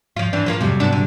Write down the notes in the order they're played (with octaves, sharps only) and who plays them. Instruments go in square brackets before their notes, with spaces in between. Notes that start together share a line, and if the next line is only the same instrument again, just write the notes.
[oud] F3 F4
E3 C4 D4
F3 A#3 F4
[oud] F2 [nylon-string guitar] C3 F#3 G3
[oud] B3 D4
D3